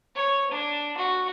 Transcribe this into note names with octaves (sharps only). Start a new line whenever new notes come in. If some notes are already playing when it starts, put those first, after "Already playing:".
C#5
D4
F#4